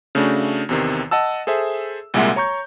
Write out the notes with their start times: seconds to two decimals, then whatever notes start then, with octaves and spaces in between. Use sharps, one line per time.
0.15 C#3 A3 D4 F#4
0.69 E2 C3 D#3
1.11 D#5 F#5 A5 E6
1.47 G#4 A4 C5 E5
2.14 C2 A#2 G#3 A#3 E5 F#5
2.36 C#5 A#5 C#6 G6